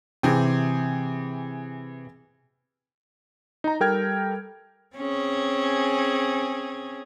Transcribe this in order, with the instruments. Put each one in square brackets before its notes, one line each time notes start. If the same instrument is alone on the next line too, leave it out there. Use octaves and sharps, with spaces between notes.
[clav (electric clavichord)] C3 [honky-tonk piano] E3 G#4 G5
[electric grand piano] D#4 A#5
G3 A4 A#4 G5 F6 G#6
[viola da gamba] C4 C#4 G#4